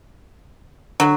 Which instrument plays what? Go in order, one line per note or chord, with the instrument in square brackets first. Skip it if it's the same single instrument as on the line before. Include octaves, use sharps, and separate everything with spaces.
[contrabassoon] D3 [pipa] F#3